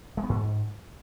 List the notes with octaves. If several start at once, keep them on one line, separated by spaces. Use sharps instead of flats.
G#3
B3
G#2